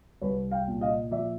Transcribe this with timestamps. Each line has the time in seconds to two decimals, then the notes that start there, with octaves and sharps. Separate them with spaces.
0.21 C2 B4 C#5
0.51 F5 G5
0.67 A#2
0.81 D#5 F5
1.11 F3 D5 E5